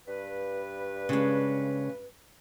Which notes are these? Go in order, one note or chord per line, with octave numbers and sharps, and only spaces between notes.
G2 B4
C#3 G#3